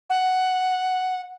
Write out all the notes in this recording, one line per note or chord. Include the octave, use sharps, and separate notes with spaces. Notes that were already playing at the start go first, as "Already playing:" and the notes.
F#5